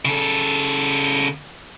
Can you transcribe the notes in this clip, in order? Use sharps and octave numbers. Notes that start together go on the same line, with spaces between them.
C#3 A4